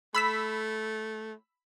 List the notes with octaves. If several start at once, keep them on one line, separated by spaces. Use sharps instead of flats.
A3 B5 E6 B6